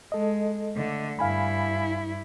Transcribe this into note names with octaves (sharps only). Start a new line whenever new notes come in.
G#3 A4 D#5
D3 A3
G2 E4 F5 G#5 B5